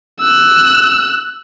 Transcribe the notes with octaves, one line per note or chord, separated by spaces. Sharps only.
E6 F#6